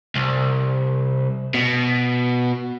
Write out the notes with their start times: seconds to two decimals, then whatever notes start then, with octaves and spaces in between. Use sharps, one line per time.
0.15 C2
1.54 B2